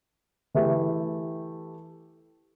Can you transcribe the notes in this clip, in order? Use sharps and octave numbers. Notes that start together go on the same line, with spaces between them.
E3 A3 E4 G4